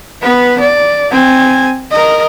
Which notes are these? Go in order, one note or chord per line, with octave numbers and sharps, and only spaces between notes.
B3 B4
D5
C4 G#5
A#4 D#5